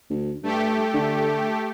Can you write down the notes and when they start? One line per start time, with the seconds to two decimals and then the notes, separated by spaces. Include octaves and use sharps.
0.10 D2
0.43 G2 A3 G4
0.94 D3